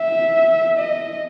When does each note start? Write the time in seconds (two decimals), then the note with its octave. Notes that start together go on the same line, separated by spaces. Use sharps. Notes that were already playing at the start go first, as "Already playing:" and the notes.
Already playing: E5
0.78 D#5